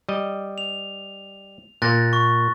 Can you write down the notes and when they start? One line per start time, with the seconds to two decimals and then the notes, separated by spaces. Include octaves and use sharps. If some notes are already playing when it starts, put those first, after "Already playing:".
0.09 G3 D#5
0.58 F7
1.82 A#2 A#3 F#6 A6 A#6
2.13 C#6